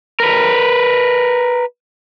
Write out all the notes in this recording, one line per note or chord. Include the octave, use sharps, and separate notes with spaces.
A#4 B4